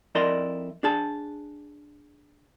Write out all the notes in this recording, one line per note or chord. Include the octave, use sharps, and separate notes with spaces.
F2 E4 A#4 D5 D#5 C6
D4 G#4 A5